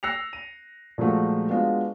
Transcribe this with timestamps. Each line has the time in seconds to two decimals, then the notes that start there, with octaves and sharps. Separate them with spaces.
0.03 E6 F#6 A#6 C7 C#7 F7
0.33 D#7
0.98 A#2 F3 G#3 A3 F#4
1.50 G#3 B3 D4 F4 F#4